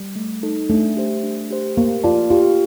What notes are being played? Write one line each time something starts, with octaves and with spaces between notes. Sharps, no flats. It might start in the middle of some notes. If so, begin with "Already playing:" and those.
Already playing: G3
A3
D#4 A4
A3 D4
G4 C5
D4
G4 C5
A#3 G4
F4 D5 A5
F4 G4